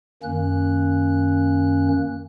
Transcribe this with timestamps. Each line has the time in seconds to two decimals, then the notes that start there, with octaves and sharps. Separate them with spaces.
0.23 F#2 D#3 A#3 C#4 F#6